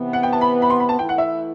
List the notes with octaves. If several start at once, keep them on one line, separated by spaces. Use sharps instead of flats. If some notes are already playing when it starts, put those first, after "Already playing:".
Already playing: C3 E3 B3
F#5
G5
A5
B5
B5
C6
B5
A5
E3 A3 E4 G5
F#5
E5